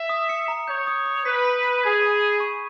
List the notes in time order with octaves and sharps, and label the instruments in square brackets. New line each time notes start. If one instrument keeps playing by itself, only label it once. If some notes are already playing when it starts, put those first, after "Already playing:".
Already playing: [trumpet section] E5
[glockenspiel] D#6
C#7
A#5
[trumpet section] C#5 [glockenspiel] G6
[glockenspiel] D#6
D#6
[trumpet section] B4 [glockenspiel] B6
[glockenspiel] B6
D#7
[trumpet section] G#4 [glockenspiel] G#6
[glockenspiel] B5
D#7
C#6